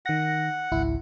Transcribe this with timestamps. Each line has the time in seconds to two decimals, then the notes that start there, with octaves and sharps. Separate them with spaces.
0.06 D#3 F#5 A#6
0.72 G#1 C#2 E4